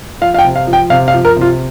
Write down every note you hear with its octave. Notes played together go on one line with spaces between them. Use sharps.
F3 F5
F5
G5
C3
F5
F3
G5
C3 F5
F5
F3
A#4
C3 F4